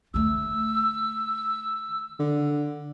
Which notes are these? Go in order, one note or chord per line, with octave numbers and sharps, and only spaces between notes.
D3 A3 E6
D3